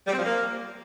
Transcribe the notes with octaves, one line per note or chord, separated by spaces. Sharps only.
G3
C4
F3
A#3